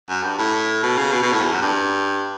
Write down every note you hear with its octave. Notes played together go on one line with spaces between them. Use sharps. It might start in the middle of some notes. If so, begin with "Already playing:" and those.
F#2
G2
A2
B2
C#3
B2
B2
A2
E2
F#2
G2